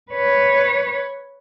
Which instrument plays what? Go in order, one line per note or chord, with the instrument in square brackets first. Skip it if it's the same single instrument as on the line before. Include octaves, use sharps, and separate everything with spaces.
[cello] B4 C#5